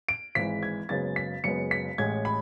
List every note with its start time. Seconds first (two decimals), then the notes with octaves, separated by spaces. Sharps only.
0.09 D7
0.35 G#1 G#2 E3 G#3 B6
0.63 G#6
0.89 F#1 F#2 C#3 G#3 B3 A6
1.16 B6
1.44 F#1 F#2 C#3 G#3 B3 C#7
1.71 B6
1.98 A1 A2 G#3 G#6
2.25 B5